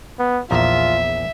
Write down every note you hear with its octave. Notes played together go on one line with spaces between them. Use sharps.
B3
A#1 E2 F4 E5 A#5